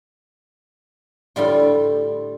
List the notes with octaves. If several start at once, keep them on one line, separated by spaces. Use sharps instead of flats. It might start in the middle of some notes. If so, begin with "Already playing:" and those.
A2 D3 G3 F4